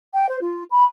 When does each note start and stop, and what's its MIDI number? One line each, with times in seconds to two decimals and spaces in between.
0.14 0.27 79
0.29 0.37 72
0.41 0.63 65
0.71 0.84 83